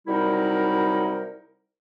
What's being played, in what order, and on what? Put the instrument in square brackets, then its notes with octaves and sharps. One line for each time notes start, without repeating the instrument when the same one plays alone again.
[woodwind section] C3 F#3 G3 D#4 E4 A#4